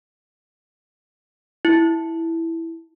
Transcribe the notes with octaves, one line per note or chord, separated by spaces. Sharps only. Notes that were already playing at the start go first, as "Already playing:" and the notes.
E4